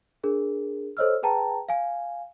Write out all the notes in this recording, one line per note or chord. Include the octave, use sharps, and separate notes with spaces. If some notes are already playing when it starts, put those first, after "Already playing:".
D4 G#4 A#4
A4 C5 C#5 D#5 E6 F6
G#4 B4 G5 A5 A#5
F5 G#5